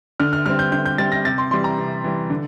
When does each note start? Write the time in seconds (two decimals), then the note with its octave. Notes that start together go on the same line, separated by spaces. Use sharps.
0.20 D3 F6
0.33 F6
0.46 G3 C4 F6
0.59 G6
0.72 D3 G6
0.86 G6
0.98 G3 C4 A6
1.12 A#6
1.25 C3 A6
1.38 C6
1.51 E3 G3 C6
1.64 A#5
1.78 C3
2.04 E3 G3
2.30 D3